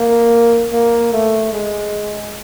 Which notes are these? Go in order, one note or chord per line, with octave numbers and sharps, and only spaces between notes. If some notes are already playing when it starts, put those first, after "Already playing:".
Already playing: A#3
A#3
A3
G#3